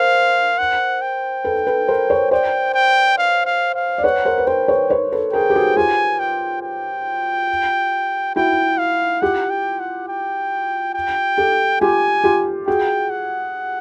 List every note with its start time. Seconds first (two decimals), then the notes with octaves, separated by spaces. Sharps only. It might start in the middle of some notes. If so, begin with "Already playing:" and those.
Already playing: A#4 C5 F5
0.59 F#5
1.02 G5
1.44 A4 B4
1.67 A4 B4
1.88 A#4 C5
2.10 B4 C#5
2.31 C5 D5 G5
2.74 G5
3.18 F5
3.46 F5
3.75 F5
3.98 D5
4.04 B4 C#5 F#5
4.25 A#4 C5
4.38 B4
4.47 A#4 C5 G5
4.68 B4 C#5
4.90 B4 C#5
5.12 A4 B4
5.33 G#4 A#4 G5
5.50 G4
5.56 F#4 G#4
5.77 F4 G4 G#5
6.19 G5
6.63 G5
8.36 E4 F#4 G5
8.78 F5
9.21 F4 G4 F#5
9.50 G5
9.80 F#5
10.09 G5
10.94 G5
11.38 G4 A4
11.81 F4 G4 G#5
12.24 F4 G4
12.67 F#4 G#4 G5
13.10 F#5